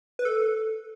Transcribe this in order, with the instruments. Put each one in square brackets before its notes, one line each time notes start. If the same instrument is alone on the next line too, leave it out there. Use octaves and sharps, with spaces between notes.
[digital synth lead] B4
A4